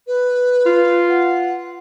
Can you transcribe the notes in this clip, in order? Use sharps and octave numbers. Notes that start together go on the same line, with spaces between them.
B4
F4
F#5